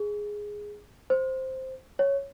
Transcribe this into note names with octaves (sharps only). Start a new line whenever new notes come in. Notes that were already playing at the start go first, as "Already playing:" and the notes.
Already playing: G#4
C5
C#5